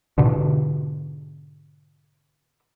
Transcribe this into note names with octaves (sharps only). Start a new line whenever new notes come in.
G#2 B2 D3